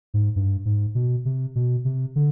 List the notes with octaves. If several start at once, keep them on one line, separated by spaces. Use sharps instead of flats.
G#2
G2
G#2
B2
C3
B2
C3
D3